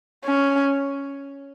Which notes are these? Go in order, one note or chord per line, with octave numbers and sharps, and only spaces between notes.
C#4